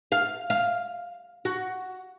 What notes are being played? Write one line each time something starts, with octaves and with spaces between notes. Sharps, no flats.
F5
F5
F#4